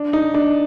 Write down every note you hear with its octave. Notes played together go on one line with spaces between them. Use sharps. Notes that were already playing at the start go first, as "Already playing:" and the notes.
Already playing: D4
D#4
D4